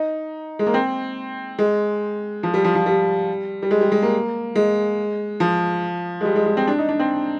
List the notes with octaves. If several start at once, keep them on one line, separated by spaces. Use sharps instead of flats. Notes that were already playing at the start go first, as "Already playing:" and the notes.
Already playing: D#4
G#3
A#3
C4
G#3
F3
G3
F3
F3
G3
G3
G#3
G3
G#3
A#3
G#3
F3
G#3
G3
G#3
G#3
C4
D4
D#4
D4
C4